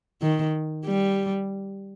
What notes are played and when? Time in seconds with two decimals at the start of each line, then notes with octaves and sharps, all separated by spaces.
0.22 D#3
0.86 G3